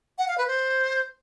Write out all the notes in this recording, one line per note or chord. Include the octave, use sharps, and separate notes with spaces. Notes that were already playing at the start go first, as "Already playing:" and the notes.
F#5
F5
B4
C5